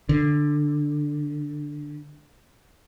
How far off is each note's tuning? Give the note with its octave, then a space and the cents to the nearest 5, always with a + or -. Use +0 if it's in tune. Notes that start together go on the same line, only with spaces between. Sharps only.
D3 +5